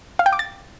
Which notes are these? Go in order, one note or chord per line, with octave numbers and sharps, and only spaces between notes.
F5
G5
D6
A6